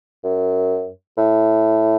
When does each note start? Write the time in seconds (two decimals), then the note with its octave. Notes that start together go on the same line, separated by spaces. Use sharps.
0.24 F#2
1.17 A2